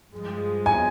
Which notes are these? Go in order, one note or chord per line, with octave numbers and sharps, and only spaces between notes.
G2 F3 G#3
G#5